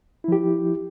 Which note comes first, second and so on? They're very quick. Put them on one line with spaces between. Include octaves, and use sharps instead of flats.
E4 F3 G4